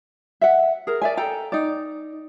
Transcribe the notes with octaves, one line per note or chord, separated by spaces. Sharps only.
E5 F#5
G#4 A#4
D5 E5 G#5
A4 G5 A#5
D#4 D5